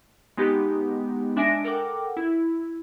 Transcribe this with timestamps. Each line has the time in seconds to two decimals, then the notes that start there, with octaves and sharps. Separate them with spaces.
0.37 G#3 B3 D#4 G4
1.36 G#3 D4 E5 G#5 A#6 D7
1.64 A4 A#4 F#5 G5 D6
2.17 E4